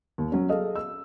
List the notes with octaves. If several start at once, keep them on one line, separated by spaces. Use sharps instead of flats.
D#2
F#3 C#4
G#4 A4 D#5 F5
E6